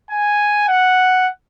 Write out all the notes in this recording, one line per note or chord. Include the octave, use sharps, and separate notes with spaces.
G#5
F#5